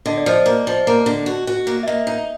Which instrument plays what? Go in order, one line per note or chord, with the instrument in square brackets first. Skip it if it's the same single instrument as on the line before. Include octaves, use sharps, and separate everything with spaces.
[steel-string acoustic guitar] D3 [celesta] D#5
[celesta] D5
[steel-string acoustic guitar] F3 [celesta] D#5
[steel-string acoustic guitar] A#3
F3
A#3
D3
F#4
F#4
A#3
[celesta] E5
[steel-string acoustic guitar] A#3 [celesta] D#5
[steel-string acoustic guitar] D#4